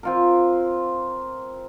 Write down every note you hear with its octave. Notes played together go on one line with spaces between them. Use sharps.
C4 F4 A#4